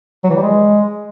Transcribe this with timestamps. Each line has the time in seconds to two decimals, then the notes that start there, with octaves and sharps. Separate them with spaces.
0.24 F#3
0.30 E3
0.36 G3
0.42 G#3